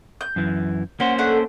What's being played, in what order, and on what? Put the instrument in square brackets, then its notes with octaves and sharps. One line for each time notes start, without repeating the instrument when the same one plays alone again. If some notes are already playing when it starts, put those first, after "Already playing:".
[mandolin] G6
[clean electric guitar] F#2 E3
[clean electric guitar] A#3 C#4 C5 [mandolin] F#4
[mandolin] A3 D4 F#5